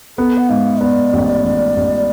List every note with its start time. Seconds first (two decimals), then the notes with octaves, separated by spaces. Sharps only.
0.18 B3 A4
0.37 F#5
0.49 G#2 F5
0.81 B3 D5
1.13 A1
1.44 A1
1.76 A1